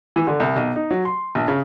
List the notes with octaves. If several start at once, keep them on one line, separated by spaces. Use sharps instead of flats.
E3
D3
C2
B1
D#4
F#3
C6
A#1
C#3